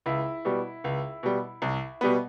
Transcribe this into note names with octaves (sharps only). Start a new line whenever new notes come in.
C#2 E4
B2 G3
C#2
B2 G3
C2
B2 G3 B3